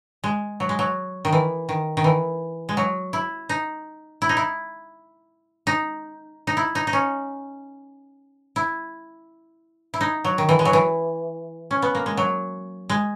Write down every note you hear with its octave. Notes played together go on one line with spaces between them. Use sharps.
G#3
F#3
G#3
F#3
D#3
E3
D#3
D#3
E3
G#3
F#3
E4
D#4
E4
D#4
E4
D#4
D#4
E4
D#4
D#4
C#4
E4
E4
D#4
F#3
D#3
E3
G#3
F#3
E3
C#4
B3
A#3
G#3
F#3
G#3